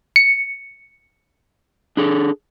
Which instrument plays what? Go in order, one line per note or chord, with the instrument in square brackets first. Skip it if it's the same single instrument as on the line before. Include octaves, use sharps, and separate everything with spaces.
[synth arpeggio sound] C#7
[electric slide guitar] D4 G#4 A4